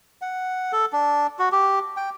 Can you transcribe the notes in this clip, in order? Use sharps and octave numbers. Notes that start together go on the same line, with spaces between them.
F#5
A4
D4
F#4
G4
G5